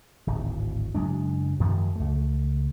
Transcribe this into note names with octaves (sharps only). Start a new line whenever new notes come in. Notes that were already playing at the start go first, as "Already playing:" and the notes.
D1 G#1
F#1 F#3 G#3 D4
F#2 D#3 F3 G#3
C#2 A3